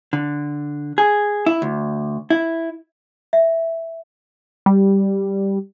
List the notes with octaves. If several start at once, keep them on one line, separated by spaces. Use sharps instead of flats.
D3
G#4
E4
D2
E4
E5
G3